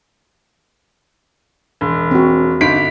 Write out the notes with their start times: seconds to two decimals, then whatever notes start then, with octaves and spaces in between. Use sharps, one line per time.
1.81 E1
2.11 C4 F#4
2.61 G1 D#4 B6 D7